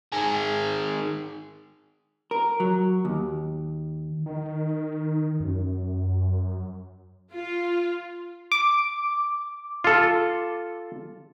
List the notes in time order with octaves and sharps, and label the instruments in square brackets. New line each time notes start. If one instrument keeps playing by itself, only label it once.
[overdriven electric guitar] D#3 G#4
[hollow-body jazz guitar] A#4
F#3
D#2
[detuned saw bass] D#3
F#2
[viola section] F4
[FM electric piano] D6
[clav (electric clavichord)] F4 A4